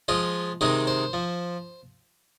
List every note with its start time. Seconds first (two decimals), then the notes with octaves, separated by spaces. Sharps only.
0.08 F3 G#3 F4 D#5
0.61 C3 D#3 G#3 C4 D#4 D#5
0.87 C5
1.13 F3